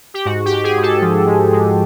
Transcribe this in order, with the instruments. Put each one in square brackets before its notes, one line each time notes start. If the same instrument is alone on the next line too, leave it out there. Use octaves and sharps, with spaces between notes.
[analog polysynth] G4
G#2 F#4
G4
G#2
G#4
G#2
A4
F3
G#3
G#3